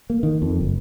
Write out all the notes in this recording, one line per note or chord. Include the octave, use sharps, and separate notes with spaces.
A#3
D#3
F2
F#1